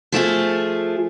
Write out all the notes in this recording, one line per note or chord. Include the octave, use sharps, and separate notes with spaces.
F3 A3 F4 G#4